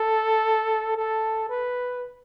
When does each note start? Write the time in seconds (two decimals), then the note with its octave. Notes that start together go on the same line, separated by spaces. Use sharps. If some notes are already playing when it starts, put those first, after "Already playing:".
Already playing: A4
0.96 A4
1.49 B4